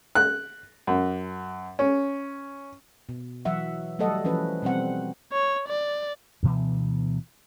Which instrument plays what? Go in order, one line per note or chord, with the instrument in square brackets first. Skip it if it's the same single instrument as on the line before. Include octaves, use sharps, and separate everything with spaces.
[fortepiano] F#6
F#2
C#4
[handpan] B2
E3 F#3 E5 F#5
F#3 G3 A3 A4 D#5 F#5
E3 F3 C#4 B4
B2 G3 C4 F#5
[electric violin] C#5
D5
[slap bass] D2 B2 E3 B3